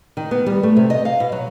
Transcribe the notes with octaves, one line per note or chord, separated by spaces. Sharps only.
D#3
B3
G3
A3
C3
D#5
F5
B2
F#3